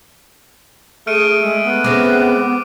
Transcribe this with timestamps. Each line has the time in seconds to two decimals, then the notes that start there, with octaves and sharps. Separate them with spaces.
1.07 A3 G#4 F6 D7 D#7
1.43 G#3 E6 D7
1.64 B3
1.84 G#3 C4 C#4 D6